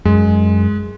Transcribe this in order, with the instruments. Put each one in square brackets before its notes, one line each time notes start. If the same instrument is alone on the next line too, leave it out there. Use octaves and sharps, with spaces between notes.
[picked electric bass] F#2 [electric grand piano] G#3